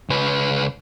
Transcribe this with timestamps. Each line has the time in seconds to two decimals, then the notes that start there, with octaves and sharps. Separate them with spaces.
0.10 C#2 B4